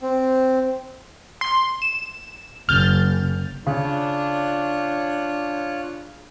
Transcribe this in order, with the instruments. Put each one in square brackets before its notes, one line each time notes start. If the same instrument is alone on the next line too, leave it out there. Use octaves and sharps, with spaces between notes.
[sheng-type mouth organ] C4
[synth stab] C6
E7
[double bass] F#1 [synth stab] F6 G6 A6
[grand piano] C#3 [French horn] D4 [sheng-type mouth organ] F4 C#5 F#6